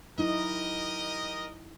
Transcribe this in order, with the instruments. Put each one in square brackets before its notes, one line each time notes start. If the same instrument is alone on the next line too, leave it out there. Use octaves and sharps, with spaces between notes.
[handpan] F#3 D#4 E4 [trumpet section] G4 A#4 D#5